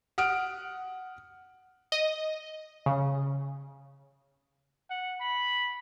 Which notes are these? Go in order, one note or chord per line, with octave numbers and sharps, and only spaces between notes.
F#5 D#6 F6 D7
D#5
C#3
F#5
B5